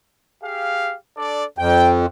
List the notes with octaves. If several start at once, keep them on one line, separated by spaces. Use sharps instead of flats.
G4 G#4 F5
D4 A4 D5
F2 G5